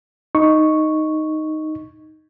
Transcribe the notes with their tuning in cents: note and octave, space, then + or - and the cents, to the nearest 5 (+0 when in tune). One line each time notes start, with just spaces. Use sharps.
D#4 +0 C#6 +0